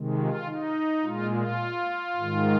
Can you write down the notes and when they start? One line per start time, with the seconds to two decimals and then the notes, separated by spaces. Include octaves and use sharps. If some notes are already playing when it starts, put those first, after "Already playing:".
Already playing: C3 D#3 G#3
0.18 F4
0.45 D#4
1.02 A#2 G#3 F4
1.31 F4
2.16 G#2 D#3 G#3